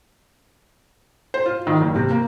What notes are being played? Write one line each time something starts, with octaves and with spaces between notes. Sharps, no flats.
C5
F4
D#3
F#1
C3
A#3